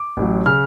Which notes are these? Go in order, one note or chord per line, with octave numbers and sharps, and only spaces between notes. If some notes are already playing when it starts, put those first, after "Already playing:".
Already playing: D6
A1 A2 F#3
C#3 F6